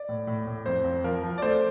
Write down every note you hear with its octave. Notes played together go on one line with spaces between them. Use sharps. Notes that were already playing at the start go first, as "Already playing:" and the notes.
Already playing: D5
A2
A2
A2
F2 C5
F2
F3 A#4
F3
D5
A3 C5